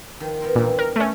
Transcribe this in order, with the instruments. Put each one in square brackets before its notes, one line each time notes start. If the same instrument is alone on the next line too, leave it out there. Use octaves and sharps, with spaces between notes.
[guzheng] D#3 F3
B3 A#4 C5
[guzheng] G2 E3 G3 [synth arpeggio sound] A#2
[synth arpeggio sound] A#4
A3 C#4